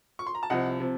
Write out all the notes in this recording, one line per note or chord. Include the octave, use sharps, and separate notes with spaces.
C#6
C6
A#5
A5
C2 C3 F3 D#5 F#5
C3 F3